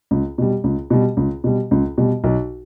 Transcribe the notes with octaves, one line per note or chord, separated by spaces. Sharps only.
C#2
B2 G3
C#2
B2 G3
C#2
B2 G3
C#2
B2 G3
B1